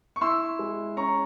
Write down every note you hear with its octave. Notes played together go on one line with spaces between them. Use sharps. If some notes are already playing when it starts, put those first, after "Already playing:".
C#6
E4 C6 E6
G#3
C#4 A#5 C#6